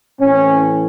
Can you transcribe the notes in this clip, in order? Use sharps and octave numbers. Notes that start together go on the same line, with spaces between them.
A2 E3 C4 C#4